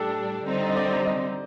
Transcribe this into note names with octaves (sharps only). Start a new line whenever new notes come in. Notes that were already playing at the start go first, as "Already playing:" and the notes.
Already playing: A2 G3 D4 G4 A4
D3 G3 C4 D#4
D#5
D5
C5
D#5